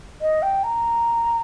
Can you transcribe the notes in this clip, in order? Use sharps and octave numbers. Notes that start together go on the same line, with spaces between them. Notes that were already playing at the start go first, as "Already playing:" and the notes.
D#5
G5
A#5